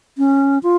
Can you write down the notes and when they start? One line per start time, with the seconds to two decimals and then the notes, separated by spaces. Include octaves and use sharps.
0.18 C#4
0.63 F4